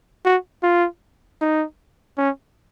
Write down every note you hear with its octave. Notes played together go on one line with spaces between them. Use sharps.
F#4
F4
D#4
C#4